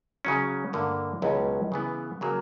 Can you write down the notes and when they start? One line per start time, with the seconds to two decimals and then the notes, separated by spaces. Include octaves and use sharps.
0.25 C#3 F#3 C#4
0.73 G2 D3 A#3
1.22 C#2 B2 F#3 C#4
1.72 C#3 E3 B3
2.21 C#3 F#3 A#3